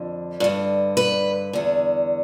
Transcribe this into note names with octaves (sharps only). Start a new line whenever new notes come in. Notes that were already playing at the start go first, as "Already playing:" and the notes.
Already playing: F2 D3
G2 D3
B4
E2 D3